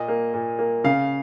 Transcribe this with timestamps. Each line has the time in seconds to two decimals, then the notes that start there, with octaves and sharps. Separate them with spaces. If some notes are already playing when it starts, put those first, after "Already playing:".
Already playing: A#2 D#5
0.09 A#3
0.34 A#2
0.59 A#3
0.84 C#3 F5